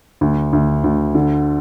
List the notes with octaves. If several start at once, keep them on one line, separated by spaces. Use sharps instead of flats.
D2
D2
D2
D3